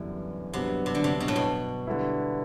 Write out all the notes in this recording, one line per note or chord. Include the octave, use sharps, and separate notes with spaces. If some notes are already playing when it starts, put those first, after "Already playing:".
Already playing: F#2 D3 E3 G3 B3 D4
G2 C3 F#3 B3 D4
C3
D3
C3
B2
A2
B2
D3 G3 B3 E4